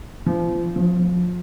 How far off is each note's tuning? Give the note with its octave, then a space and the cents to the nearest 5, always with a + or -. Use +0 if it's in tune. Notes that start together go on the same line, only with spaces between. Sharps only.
F3 -30
F3 +30